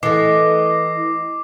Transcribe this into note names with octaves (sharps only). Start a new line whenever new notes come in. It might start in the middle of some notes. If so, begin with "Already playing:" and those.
E3 A3 D#5 D6 C7